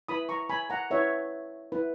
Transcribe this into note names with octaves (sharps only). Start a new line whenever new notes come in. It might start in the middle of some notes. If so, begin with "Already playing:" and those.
E4 B4 B5 D#6
A#5 C#6
G#5 B5
F#5 A#5
E4 B4 C#5 E5
E4 B4